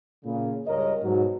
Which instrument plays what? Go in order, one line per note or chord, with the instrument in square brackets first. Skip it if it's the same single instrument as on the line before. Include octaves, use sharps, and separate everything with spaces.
[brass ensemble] A#2 C#3
C#2 G2 G#3 A#4 C#5 D#5
G#2 B2 F#3